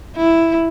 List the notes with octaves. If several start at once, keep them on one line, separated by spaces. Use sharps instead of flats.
E4